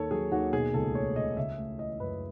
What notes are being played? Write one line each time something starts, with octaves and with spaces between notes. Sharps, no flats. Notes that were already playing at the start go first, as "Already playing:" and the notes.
Already playing: D#2 D#3 A4 C#5
F#3 G#4
D#2 F#4
B2 G#4
C#2 A4
A3 C#5
C#2 D#5
C#3 E5
A3
E3 D#5
F#2 B4